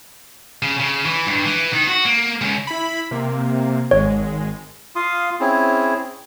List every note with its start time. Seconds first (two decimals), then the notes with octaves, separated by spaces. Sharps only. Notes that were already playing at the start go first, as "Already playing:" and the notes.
0.62 C#3
0.80 C#3
1.05 E3
1.27 G2
1.45 E3
1.73 D#3
1.88 F#4
2.05 A#3
2.41 C#2
2.67 E4 B5
3.11 C3 A#3
3.91 G#1 G#3 C#5
4.96 F4 F5 C6 D#6
5.40 C4 C#4 E4 G#4